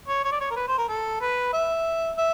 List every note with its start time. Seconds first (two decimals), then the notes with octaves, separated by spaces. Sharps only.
0.08 C#5
0.25 C#5
0.32 D5
0.40 C#5
0.51 A#4
0.56 B4
0.68 C5
0.78 A#4
0.89 A4
1.21 B4
1.53 E5
2.17 E5